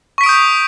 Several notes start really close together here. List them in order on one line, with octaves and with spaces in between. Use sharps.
C#6 B6 D7 D#6 G6